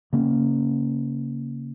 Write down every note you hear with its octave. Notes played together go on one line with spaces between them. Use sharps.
C#3 A#3 C#4